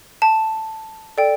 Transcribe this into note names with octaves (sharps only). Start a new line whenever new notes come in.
A5
A4 D5 G5